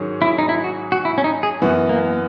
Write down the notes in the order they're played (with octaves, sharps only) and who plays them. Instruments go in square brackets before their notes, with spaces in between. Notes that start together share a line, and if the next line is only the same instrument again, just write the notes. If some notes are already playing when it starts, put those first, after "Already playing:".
Already playing: [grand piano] G#2 D#3 F#3 C#4 G#4
[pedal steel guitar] E4
D#4
E4
F#4
F#4
E4
C#4
D#4
G#4
[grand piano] F#2 E3 B3 [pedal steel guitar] F#4
[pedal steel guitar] A#3